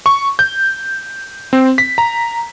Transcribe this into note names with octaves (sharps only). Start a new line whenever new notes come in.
C#6
G6
C4
B6
A#5